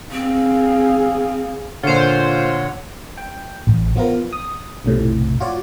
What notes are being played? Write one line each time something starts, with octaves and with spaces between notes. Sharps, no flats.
C4 G#4 F5
A#2 D3 F4 C5 C#5 F#5
G5
A1
F3 B3 F4 A#4
D#6
B1 F2 A2 C3
F4 F#4 C#5 D5